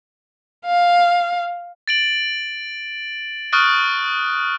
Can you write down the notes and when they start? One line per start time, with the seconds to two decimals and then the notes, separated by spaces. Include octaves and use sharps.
0.66 F5
1.88 A6 D7 F#7
3.52 C#6 D#6 F6 F#6 A6 D7